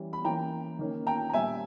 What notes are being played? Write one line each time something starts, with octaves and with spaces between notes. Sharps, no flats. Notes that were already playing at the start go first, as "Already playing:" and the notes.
Already playing: E3 G3 C#4
B5
E3 A#3 C#4 G5 A#5
D#3 A#3 C#4
G5 A#5
A#5
A#2 G3 C#4 E5 G#5